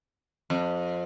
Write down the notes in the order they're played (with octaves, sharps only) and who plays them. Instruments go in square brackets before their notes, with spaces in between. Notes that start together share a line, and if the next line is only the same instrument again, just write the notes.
[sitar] F2